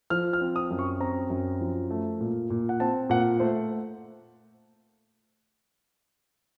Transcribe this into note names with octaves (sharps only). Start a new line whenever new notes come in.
F3 F6
F6
C4
D#6
F#2
C#6
C4 A#5
F#2
F3
A3
A#2
A#2
F#5
C4 A5
A#2 F#5
A3 C5